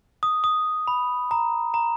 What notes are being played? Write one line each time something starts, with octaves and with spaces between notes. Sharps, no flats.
D#6
D#6
B5
A#5
A#5